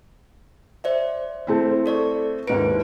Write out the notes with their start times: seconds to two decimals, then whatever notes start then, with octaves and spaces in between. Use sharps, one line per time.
0.84 C5 D5 E5
1.47 A3 C4 E4
1.86 A4 D5 C#6
2.47 D#2 G#2 E4 B4 D7